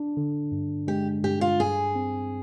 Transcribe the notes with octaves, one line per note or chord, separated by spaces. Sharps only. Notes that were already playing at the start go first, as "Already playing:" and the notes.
Already playing: D4
D3
G2
G#3 G4
G2 G4
F4
G2 G#4
C4